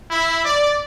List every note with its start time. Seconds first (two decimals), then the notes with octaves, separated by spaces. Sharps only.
0.11 E4
0.45 D5